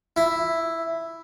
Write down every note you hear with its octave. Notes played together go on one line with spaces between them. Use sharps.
E4